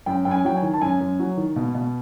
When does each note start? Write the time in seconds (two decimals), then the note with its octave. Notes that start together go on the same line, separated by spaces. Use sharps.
0.06 F#2 G5
0.25 F#2 G5
0.31 G#5
0.45 F#3 G5
0.57 G#5
0.62 D#3
0.74 A5
0.81 F#2 G#5
1.00 F#2
1.19 F#3
1.37 D#3
1.56 B2
1.75 B2